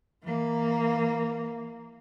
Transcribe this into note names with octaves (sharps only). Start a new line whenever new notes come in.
E3 A#3